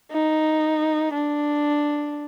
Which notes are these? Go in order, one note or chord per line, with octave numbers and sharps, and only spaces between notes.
D#4
D4